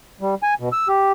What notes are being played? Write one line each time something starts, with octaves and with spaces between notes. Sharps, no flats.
G3
G#5
B2
E6
G4